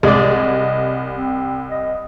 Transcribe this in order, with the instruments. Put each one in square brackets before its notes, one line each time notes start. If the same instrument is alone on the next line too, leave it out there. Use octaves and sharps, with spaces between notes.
[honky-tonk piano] C2 [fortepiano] G#3 D5 [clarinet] D#5
[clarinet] C4
D#5